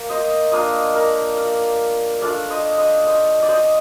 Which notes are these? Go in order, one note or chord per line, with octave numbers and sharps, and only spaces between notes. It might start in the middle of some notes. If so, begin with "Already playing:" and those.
Already playing: A#3 A#4
C5 D#5
A#3 D4 F4 C5 D#5
A#4 D5
D5 F5
A3 D4 F4 D5 F5
C5 D#5
C5 D#5
C5 D#5
D5
C5 D#5